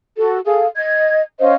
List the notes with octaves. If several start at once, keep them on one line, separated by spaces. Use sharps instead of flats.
F#4 A4
G#4 A4 F5
D#5 G#6
C#4 C5 D#5 F5